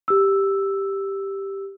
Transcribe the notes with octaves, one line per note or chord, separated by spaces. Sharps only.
G4 E6